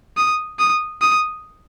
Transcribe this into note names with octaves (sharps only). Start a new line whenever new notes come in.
D#6
D#6
D#6